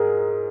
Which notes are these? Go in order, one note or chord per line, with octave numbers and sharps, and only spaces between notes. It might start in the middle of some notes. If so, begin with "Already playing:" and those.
Already playing: G#2 G#4 A#4